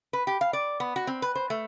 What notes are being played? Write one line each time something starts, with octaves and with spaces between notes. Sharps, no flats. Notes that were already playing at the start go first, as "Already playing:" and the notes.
B4
G4
F5
D5
B3
F#4
C4
B4
C5
A3